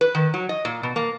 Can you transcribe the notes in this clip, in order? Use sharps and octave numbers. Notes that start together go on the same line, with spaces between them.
B4
D#3
F#3
D#5
A#2
B2
A#3